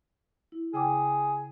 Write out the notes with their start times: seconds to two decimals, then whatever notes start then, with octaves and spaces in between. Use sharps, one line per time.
0.52 E4
0.74 C#3 G#4 G5 D6